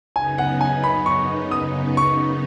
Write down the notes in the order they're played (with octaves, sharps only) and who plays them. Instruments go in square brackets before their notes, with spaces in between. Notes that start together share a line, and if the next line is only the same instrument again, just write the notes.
[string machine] F#2 C#3 B3 D#4 [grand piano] G#5
[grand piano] F#5
G#5
B5
C#6
D#6
C#6